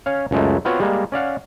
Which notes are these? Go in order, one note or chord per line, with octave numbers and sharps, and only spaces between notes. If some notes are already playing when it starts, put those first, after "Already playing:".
C#4 C#5 F5
C#2 F#2 G#3 A3
B3 C4 F4 F#4 B4 C#5
G3 G#3 A#3
C#4 D5 F5 F#5